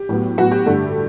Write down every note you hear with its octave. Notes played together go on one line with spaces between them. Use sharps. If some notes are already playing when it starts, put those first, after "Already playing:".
Already playing: G4
A2 F#3 B3
A2 F#3 B3 F#4
G4
G2 D3 A3